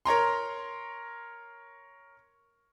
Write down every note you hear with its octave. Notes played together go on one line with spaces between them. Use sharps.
A#4 C#5 A#5 C6